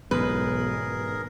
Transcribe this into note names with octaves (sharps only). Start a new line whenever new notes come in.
B1 G#2 E3 B3 G#4 A#4 B4